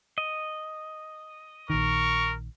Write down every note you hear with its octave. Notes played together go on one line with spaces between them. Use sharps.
D#5
A#1 D#3 A#4 C#6